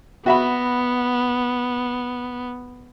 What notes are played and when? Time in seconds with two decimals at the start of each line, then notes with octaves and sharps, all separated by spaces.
0.26 B3 F#4 E5 B5